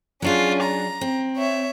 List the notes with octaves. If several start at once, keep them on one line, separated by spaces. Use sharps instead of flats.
F#3 C#4 D4 F4 G#4
A#5
C4
C#5 E5